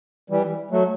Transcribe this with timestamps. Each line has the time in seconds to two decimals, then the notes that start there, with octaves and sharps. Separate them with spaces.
0.30 E3 G3
0.71 F#3 A3